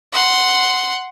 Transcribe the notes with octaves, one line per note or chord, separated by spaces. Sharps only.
F#5 C6